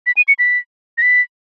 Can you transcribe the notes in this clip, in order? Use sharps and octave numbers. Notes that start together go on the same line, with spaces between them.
B6
D#7
C#7
B6
A#6
B6